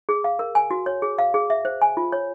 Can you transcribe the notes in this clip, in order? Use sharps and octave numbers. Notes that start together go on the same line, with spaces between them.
G#4
F5
A#4
G#5
F#4
C#5
G#4
F5
G#4
E5
C5
G#5
F4
C#5